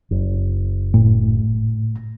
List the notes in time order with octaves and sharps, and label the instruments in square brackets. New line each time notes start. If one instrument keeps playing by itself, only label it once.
[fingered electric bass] F#1
[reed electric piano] A2